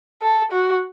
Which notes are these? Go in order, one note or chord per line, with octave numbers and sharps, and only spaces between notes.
A4
F#4